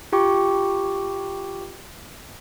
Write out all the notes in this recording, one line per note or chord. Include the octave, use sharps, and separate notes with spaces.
F4 G4 G5 C#6 D6